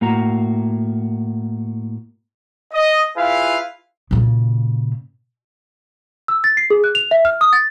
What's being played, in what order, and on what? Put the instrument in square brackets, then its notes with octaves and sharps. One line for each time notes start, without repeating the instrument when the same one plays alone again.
[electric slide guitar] A2 A#3 F#4 A#5
[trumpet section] D#5
E4 F4 G#4 B4 F5
[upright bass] A#2 C#3
[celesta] E6
A6
C7
G#4
F#6
F7
E5
F6
D#6
A6